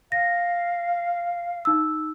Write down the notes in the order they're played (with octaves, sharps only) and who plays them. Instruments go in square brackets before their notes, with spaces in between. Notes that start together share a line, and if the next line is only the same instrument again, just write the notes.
[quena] F5 [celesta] A#6
[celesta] D#4 E6